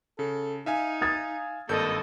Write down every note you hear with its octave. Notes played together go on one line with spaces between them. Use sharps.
C#3 A4
D#4 E5 F5 G#5
D#6 G#6 A6
G#1 G2 A#3 A4 D#5 G6